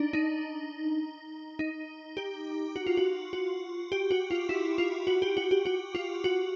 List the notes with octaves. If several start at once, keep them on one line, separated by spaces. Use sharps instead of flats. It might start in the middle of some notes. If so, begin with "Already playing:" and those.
Already playing: D4 D#4
D#4
D#4
G4
F#4
F4
F#4
F#4
G4
F#4
F4
E4
F4
F#4
G4
F#4
G4
F#4
F4
F#4